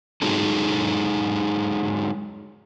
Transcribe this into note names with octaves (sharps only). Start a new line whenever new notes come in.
F#3 G#3 D#4 F#4 G#4 A4